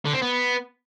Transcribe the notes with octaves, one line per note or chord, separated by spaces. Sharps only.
D3
C4
B3